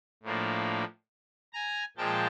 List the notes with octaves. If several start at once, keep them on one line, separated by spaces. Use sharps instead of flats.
A2 F3 A#3 D4
G#5 A#5
A#2 F3 G#3 G5 A5